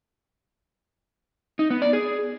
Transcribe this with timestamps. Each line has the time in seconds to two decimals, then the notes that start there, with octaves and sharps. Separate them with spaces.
1.59 D#4
1.70 B3
1.82 D5
1.93 G#4